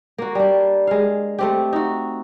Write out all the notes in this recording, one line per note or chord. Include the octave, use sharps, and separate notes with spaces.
A#3 F#4
G3 D4
G#3 F5
A3 C4 G4
D#4 F#4